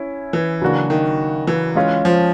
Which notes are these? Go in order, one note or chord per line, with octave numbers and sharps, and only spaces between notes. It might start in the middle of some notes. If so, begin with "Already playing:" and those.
Already playing: C#4 E4
E3
C#3 F#3 A#3 D4 F#4
D#3
E3
G#3 C#4 F4
F3